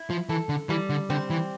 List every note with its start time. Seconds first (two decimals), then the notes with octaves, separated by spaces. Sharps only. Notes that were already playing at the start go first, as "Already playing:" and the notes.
Already playing: E4
0.10 F3
0.29 E3 A4
0.49 D3
0.69 E3 G3
0.90 D3
1.10 D3 C4
1.30 E3